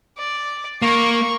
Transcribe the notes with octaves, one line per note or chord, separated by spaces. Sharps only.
D5
A#3 C#6